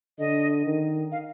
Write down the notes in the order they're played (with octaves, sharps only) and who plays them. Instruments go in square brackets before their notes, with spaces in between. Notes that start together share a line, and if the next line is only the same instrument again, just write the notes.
[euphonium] D3 [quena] D#5
[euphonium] D#3
[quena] F5